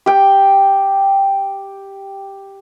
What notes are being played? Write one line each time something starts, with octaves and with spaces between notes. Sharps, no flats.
G4 G5